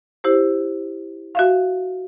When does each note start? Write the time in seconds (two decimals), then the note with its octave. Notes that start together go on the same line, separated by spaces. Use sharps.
0.24 E4 G4 C5
1.35 F#4 E5 F5